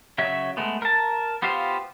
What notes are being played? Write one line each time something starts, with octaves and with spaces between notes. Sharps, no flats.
C#3 F#3 C#5 E5
G#3 A3 B3
A#4 A5
B3 F4 G4 C5 F5